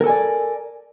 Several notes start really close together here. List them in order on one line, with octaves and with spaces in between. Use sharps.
A#4 A4 G#5 D5